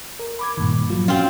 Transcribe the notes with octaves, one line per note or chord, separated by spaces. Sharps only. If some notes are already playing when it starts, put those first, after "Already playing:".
A#4
B5 D6 G#6
G2 A#2 D#3
F3 F#3 F4
C4 C#4 F4 F#4